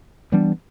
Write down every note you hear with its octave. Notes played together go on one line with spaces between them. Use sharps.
E3 G3 B3 D4